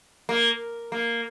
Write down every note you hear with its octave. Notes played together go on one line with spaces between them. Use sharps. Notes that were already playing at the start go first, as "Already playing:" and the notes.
A#3
A#3